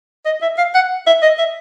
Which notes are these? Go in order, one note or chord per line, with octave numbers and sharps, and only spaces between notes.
D#5
E5
F5
F#5
E5
D#5
E5